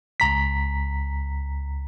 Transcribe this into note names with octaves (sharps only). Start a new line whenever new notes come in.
C#2 A#5 B6